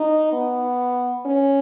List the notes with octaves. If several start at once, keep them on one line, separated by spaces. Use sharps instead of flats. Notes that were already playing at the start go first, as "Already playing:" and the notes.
Already playing: D#4
B3
C#4